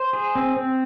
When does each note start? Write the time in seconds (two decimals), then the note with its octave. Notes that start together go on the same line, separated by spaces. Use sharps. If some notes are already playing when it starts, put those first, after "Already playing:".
Already playing: C5
0.13 G#4
0.35 C4
0.57 C4